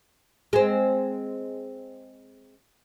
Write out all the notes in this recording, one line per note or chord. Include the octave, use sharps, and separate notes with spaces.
G#3 C4